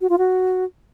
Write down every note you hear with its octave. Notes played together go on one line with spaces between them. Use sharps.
F#4
F4
F#4